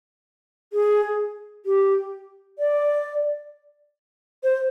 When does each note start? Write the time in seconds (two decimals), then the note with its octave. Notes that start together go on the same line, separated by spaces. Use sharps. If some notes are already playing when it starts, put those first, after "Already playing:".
0.73 G#4
1.66 G4
2.59 D5
4.44 C5